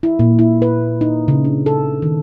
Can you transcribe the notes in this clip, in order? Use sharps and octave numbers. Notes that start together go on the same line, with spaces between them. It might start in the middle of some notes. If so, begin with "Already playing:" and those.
E4
A#2
E4
B4
D#4
C#3
D4
A4
D#3